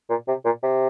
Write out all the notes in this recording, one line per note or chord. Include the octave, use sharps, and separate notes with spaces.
A#2
C3
A#2
C3